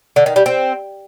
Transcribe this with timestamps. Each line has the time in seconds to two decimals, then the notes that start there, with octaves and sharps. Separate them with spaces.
0.16 D3
0.26 D#3
0.36 G3
0.46 C4